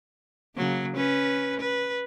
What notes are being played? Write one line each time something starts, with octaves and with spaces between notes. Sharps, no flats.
C#3 F#3 A#3
C#4 B4
B4